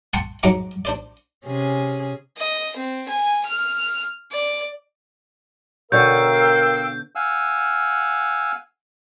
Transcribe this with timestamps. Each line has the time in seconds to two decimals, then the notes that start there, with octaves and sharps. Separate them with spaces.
0.13 F#5 G5 A5 C6 C#6
0.43 G#2 F#3 F#5 A#5 C#6 D6
0.85 D4 C5 D5
1.46 C3 C#4 G#4
2.37 D#5
2.76 C4
3.08 G#5
3.46 F6
4.31 D5
5.92 B2 D3 A#4 C#5 F5 G5 E6 G6
7.15 F5 F#5 G#5 E6